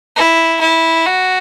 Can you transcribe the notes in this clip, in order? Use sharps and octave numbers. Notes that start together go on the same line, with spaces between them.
E4
E4
F#4